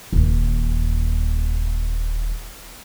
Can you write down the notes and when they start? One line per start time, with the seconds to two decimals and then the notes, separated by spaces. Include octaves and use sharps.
0.13 D#1 D#2